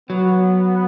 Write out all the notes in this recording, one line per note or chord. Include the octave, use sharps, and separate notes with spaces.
F#3 B3